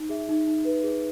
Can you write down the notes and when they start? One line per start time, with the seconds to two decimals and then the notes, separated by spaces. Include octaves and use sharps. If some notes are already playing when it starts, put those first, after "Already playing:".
Already playing: D#4
0.09 G#4 E5
0.29 D#4
0.47 D#4
0.65 B4
0.83 G#4